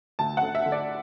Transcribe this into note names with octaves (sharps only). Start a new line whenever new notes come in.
D2 A5
F#5
D3
E5
D3
D5